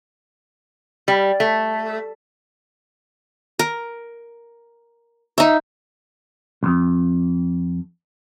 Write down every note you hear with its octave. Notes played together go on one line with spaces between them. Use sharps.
G3
A3
A#4
D#4 E5
C2 F2